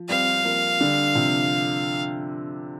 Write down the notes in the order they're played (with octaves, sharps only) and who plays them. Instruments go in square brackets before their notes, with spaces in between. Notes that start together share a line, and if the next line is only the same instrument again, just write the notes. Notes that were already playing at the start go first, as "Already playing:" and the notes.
Already playing: [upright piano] F3
[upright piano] G3 C4 [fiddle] F5
[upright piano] F3 A#3
D3 G3
C3 F3